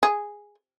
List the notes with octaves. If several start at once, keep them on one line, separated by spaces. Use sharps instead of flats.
G#4